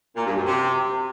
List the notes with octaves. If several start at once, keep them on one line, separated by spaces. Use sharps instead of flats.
A#2
G2
F#2
C3